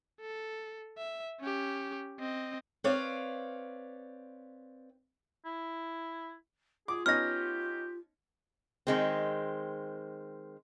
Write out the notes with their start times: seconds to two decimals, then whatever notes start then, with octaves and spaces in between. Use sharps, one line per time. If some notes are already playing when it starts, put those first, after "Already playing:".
0.20 A4
0.97 E5
1.40 C#4 G4
2.19 C4 D#5
2.84 C4 B4 C#5 D5 F5
5.45 E4
6.88 F4 G#4 D6
7.06 B3 C#4 D#4 G4 F6 A#6
8.87 D#3 G#3 C4